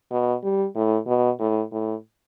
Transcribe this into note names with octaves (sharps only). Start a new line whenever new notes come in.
B2
G3
A2
B2
A2
A2